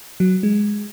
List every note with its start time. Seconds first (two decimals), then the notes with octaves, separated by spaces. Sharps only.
0.20 F#3
0.43 G#3